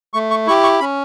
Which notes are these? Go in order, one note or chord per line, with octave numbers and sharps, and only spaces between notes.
A3 C#6
C#6
E4 G4 C#6
C#6
C#4 B5